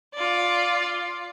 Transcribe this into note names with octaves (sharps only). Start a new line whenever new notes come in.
F4 D5